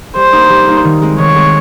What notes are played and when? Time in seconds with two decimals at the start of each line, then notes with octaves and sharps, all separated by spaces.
0.16 G3 C5
0.33 A#3 D#4
0.50 G3
0.67 A#3 D#4
0.84 D#3
1.02 G#3 C4
1.18 D#3 C#5
1.36 G#3 C4